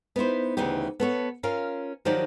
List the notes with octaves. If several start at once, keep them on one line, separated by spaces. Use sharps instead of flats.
B3 D#4 E4 C5
D2 C#3 E3 D#4 G4
B3 A4 C#5
C#4 F4 A#4 F5
D#3 F3 F#3 D#4 G4 D5